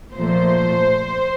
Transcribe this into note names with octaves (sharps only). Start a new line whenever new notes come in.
A#2 F3 A3 C5